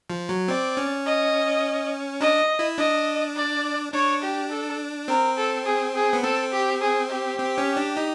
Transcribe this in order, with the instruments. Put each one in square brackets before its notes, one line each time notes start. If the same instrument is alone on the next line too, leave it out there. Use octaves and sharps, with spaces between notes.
[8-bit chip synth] F3
F#3
[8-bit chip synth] C4 [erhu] D5
[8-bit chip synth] C#4
[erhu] D#5
[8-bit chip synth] D4 [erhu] D#5
[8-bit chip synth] E4
[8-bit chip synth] D4 [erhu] D#5
[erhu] D5
[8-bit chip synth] D4 [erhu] C#5
[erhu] G4
A4
[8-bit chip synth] C4 [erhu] A#4
[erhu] A4
G#4
G#4
[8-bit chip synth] B3
[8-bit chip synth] C4 [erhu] A4
[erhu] G4
G#4
G4
[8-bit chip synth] C4
C#4
D4
D#4